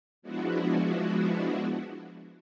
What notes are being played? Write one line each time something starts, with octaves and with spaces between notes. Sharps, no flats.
F3 G#3 B3 D4 E4 F#4